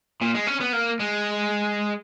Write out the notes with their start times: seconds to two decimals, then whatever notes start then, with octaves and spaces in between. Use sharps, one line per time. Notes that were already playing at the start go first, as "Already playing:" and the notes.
0.21 A#2
0.35 G#3
0.47 C#4
0.61 B3
0.74 A#3
1.00 G#3